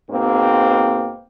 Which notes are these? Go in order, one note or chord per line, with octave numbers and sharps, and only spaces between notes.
G#2 B2 A#3 C4